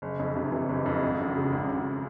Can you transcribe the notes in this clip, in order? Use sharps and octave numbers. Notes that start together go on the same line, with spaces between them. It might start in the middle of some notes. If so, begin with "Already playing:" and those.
F#1
F2
C3
E3
F#1
F2
G#1
F#2
C#3
G#1
G#1